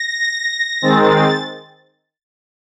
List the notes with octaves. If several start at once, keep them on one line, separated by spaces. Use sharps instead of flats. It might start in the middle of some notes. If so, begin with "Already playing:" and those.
Already playing: A#6
D#3 G#3 C4 A6